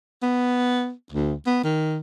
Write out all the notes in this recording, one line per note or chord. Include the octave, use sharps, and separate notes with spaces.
B3
D2
B3
D#3